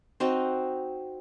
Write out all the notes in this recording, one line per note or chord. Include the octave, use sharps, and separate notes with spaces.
C4 D#4 F#4